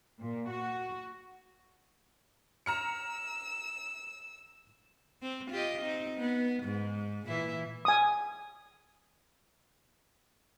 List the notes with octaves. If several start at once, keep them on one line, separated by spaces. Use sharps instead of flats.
A#2
F#4
A#5 E6 F6 C#7
C4
F4 G4 D#5
C4 D#4
B3
G#2
A#2 E3 E4
G#5 D#6